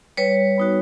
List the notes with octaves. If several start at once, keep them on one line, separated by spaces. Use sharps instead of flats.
G3 B4 C#5
B3 D#4 F#4